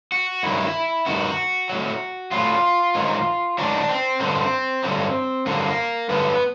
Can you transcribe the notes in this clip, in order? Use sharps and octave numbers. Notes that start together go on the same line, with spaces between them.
F#4
G2 D#3 F#3 E4
G2 D#3 F#3 F#4
A2 F#3
A2 F#3 F4
G#2 D#3 F#3
G#2 D#3 F#3 D4
C4
G2 D3 F#3 C4
G2 D3 F#3
G2 D3 F#3 A#3
G2 D3 F#3 B3